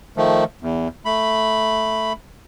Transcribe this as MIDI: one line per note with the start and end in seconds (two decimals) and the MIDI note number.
0.17 0.44 51
0.17 0.44 53
0.17 0.44 57
0.61 0.88 40
1.05 2.13 57
1.05 2.13 83